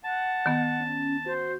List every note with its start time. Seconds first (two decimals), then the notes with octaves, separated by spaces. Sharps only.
0.04 F#5 A5
0.46 D#3 B3
0.80 C#4
1.26 F#4 C5